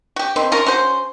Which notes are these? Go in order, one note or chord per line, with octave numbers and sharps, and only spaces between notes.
F#4 G4
D#3 C4
C#4 F4 A#4
C#4 F#4 C5